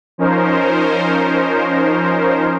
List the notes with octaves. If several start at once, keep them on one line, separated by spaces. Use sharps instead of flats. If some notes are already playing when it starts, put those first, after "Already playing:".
F3 C#4 D#4 A#4 C5